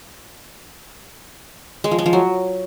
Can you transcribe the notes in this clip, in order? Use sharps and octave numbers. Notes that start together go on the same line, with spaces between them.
G#3
F3
G#3
F3
F#3